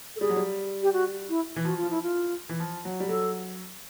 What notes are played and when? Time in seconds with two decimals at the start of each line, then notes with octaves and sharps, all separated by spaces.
0.16 A4
0.20 G3 G#4
0.30 F#3
0.36 G3
0.83 G4
0.93 F#4
1.29 E4
1.56 E3
1.65 F3 F#4
1.77 F4
1.83 F3
1.90 E4
2.03 F4
2.49 E3
2.60 F3
2.85 F#3
3.00 G3
3.08 F#3 A4